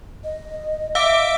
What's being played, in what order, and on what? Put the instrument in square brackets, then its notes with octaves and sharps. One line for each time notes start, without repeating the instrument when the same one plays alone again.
[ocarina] D#5
[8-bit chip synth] E5 D6 [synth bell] F5